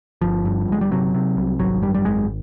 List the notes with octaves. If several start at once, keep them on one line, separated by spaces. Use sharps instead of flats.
G1 F3
G2
G1 G#3
G3
C3 F#3
C3
C2
G#1 F#3
F#2 G3
G3
G#1 G#3